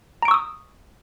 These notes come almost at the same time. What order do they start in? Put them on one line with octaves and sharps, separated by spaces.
A#5 D7 C#6 E6 D#6